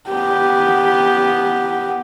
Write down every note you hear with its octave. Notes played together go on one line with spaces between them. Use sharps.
B3 G4